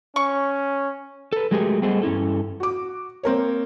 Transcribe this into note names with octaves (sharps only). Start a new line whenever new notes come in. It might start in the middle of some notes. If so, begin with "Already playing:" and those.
C#4 C#6
A4 B4
F#3 G#3 A3 G4 G#4 A#4
G3 A3 B3 G#4 C5 D#5
G2 C#4 E4 A4
F#4 D6
A#3 C4 A#4 C#5